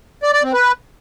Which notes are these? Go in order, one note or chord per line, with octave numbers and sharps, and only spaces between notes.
D5
D5
C4
B4